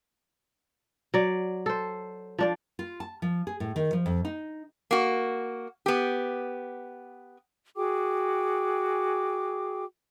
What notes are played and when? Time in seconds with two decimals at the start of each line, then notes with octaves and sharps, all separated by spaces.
1.14 F#3 D5
1.66 A4 C5
2.38 F3 D4 D5
2.79 F4
3.00 A5
3.22 F3
3.47 G#4
3.60 A2
3.76 D#3
3.93 F3
4.06 F2
4.25 D#4
4.91 A#3 F#4
5.86 B3 G4
7.76 F#4 G#4 G5 D6